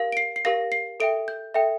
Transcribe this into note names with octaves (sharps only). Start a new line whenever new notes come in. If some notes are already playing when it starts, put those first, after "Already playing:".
Already playing: G4 A#4 F5
D7
C7
C7
G4 A#4 F5 A#6
C7
A4 E5 G5 D7
G6
A4 E5 G5